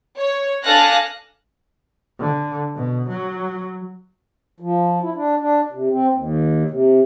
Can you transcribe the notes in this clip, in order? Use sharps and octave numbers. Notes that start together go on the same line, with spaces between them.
C#5
D4 A4 F5 G#5 F#6 A#6
D3
B2
F#3
F3
E4
D4
D4
C3
C4
D#2
C3